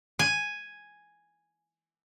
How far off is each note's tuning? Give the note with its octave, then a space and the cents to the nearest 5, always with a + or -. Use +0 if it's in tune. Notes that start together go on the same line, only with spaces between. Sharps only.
G#5 +0